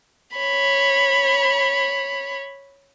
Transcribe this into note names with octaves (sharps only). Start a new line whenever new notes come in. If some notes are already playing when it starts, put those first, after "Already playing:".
C#5 B5